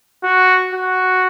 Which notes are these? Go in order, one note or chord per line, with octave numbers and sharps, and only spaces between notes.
F#4
F#4